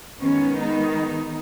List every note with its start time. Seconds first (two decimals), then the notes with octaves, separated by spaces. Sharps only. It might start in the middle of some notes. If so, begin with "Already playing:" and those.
0.22 D#3 G#3 B3 C#4
0.59 D#4